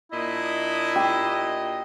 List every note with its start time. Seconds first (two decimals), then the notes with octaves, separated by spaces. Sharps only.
0.12 A#2 D4 E4 D#5
0.96 G4